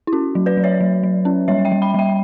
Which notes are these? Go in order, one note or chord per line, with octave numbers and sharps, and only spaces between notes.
E4
C#4 F#4
F#3
B4 D5
F#3
C#5 E5
F#3
F#3
C#4
G3 C#5 E5
E5 G5
G3
G5 B5
G3 E5 G5